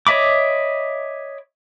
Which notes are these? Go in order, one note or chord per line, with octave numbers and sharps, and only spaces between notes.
C#5 D#5 E5 B5 D6